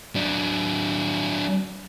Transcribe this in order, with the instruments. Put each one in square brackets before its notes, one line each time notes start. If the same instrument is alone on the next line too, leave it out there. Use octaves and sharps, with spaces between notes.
[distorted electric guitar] F#3 D4